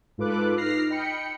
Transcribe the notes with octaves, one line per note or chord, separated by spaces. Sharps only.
G#2 F4 A4 B4 D6 F#6
D#4 F6 A#6 C7
D#5 G5 B5 C#7